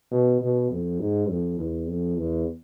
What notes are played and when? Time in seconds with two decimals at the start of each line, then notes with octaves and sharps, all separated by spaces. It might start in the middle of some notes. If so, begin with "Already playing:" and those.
0.11 B2
0.41 B2
0.71 F2
1.00 G#2
1.29 F2
1.59 E2
1.89 F2
2.18 E2